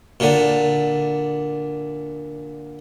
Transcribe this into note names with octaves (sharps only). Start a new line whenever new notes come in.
A#2 D3